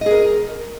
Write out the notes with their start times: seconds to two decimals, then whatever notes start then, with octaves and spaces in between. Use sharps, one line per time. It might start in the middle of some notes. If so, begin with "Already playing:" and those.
0.01 D#5
0.06 G#4
0.11 A#4